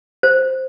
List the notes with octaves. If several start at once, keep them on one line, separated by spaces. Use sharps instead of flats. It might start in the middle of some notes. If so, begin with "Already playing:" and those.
C5